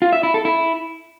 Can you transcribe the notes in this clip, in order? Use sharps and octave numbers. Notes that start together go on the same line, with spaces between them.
F4
E5
E4
A4
E4